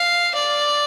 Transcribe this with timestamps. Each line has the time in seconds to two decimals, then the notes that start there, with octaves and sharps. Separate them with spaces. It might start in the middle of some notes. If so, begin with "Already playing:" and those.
Already playing: F5
0.35 D5